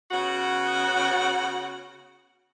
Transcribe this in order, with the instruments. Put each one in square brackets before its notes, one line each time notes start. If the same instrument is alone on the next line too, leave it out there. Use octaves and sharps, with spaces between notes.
[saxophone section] C#3 B3 F#4